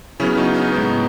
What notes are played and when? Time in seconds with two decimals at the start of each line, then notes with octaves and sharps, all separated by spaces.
0.20 C#3 F#3 B3 C#4 E4
0.37 D#4 F#4
0.54 D#4
0.72 A2 G#3 B3